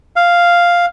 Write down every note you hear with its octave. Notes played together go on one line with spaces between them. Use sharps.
F5